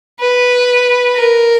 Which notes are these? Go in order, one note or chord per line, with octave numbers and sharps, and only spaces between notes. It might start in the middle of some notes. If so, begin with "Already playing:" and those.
B4
A#4